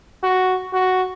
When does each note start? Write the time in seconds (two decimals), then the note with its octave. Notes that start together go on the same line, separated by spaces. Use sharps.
0.23 F#4
0.73 F#4